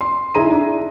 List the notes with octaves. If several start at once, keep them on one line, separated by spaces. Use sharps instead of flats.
C6
D#4 E4 G#4 A#5 D#7
D4